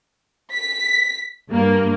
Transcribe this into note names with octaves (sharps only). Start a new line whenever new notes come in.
B6
G2 A#3